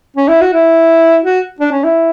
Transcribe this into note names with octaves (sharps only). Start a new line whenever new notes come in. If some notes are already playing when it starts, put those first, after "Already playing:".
C#4
E4
F#4
E4
F#4
D4
C#4
E4